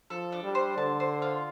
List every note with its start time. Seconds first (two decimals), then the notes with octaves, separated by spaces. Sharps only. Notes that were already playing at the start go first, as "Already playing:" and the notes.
0.10 F3 A4
0.32 D4
0.43 G3
0.55 C5
0.77 D3 A5
1.00 C5
1.22 F4